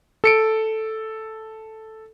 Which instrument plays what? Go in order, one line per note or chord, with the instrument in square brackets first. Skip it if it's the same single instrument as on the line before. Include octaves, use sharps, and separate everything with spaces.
[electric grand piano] A4 C#7 D7